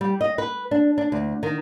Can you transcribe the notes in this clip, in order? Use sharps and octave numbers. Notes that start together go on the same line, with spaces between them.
G3
D#5
B4
D4
D4
D2
D#3